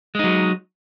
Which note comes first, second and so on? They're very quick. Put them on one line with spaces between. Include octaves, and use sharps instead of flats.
G#3 D#4 F#3